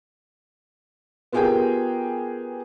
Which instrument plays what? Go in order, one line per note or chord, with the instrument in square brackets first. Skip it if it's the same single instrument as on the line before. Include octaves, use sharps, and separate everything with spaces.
[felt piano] B3 F4 G4 G#4 A#4 G5